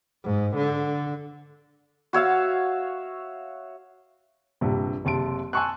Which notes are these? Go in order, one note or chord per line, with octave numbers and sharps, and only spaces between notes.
G#2
D3
F#4 C#5 E5 F5
A#1 G2 C3
F#1 C3 A5 C6 D7
G#5 A5 C6 C#6 E6 F#6